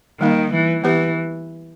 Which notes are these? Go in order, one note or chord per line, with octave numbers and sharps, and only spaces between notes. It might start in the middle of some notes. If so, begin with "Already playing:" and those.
D#3 G3 A#3 D#4
E3
E3 B3 G4 B4